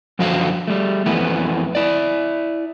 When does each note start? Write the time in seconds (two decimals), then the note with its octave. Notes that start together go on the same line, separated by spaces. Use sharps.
0.19 F#2 D3 F3 F#4 A4 F5
0.67 G3 A3
1.06 F2 E3 A3 B3
1.75 E4 D5